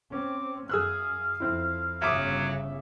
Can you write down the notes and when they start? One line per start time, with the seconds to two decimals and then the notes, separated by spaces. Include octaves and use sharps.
0.12 C4 C#4 D6
0.70 F#2 G#4 F5 E6 F#6
1.40 F2 C4 E4
2.02 G1 C#3 F#3 E5 D6 D#6